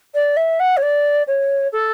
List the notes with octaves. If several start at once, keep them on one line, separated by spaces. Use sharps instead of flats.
D5
E5
F#5
C#5
D5
C#5
A4